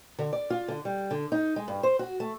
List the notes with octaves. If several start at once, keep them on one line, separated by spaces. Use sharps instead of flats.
D3
D5
F4
D3
G3
D3
D#4
G#3
G2
C5
F#4
A3